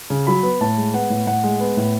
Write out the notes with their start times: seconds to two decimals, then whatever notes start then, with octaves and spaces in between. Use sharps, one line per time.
0.10 C#3
0.27 F#3 B5
0.43 B3
0.61 A2 A5
0.77 G#3
0.94 B3 F#5
1.10 A2
1.27 A2 F#5
1.43 G#3
1.60 B3
1.77 A2